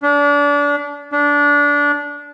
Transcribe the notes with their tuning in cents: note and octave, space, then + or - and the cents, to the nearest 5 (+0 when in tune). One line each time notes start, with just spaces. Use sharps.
D4 -30
D4 -20